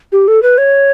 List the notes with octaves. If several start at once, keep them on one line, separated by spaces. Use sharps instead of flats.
G4
A4
B4
C#5